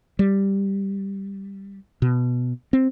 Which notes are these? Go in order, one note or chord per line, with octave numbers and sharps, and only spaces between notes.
G3
B2
C4